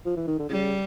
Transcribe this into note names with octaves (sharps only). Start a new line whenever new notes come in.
F3
E3
D#3
D3
C#3 G3